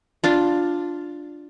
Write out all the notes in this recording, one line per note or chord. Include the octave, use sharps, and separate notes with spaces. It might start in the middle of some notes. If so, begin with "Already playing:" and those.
D4 F4